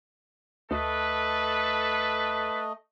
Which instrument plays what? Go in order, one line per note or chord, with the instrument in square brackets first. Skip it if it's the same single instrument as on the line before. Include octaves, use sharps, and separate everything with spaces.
[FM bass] D2 [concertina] A3 D#5 [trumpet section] A4 B4